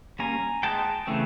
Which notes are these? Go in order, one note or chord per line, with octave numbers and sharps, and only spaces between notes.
G3 A#3 C#4 G#5 A#5
G#3 B3 D#4 G5 A5
C#3 E3 A3 C4